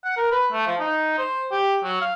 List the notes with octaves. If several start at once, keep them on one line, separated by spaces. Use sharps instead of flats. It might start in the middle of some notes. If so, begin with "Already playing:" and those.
F#5
A#4
B4
A3
F3
D#4
C5
G4
F#3
F5